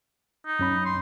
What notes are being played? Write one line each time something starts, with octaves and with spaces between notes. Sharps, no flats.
D#4
F#2 C#4 B5
C6